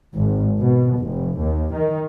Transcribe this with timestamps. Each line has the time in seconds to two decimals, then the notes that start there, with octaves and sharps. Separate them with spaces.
0.16 G#1
0.60 B2
0.98 F1
1.39 D#2
1.74 D#3